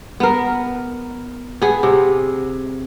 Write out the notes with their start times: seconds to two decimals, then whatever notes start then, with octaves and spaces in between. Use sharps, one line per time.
0.20 B3 A#4
1.62 B3 G#4
1.83 C3